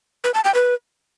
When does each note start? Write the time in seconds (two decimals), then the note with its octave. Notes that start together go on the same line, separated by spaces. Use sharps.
0.24 B4
0.34 A5
0.44 G5
0.54 B4